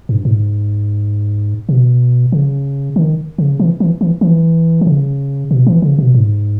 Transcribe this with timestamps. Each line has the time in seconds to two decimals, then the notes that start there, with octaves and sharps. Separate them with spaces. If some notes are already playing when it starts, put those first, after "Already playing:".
0.09 G2
0.25 G#2
1.69 B2
2.32 C#3
2.96 D#3
3.38 C#3
3.60 E3
3.80 E3
4.01 E3
4.21 E3
4.81 D#3
4.87 C#3
5.51 B2
5.67 E3
5.82 C#3
5.98 B2
6.14 G#2